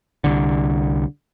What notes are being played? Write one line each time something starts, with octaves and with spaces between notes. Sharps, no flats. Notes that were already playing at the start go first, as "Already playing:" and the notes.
C2 D3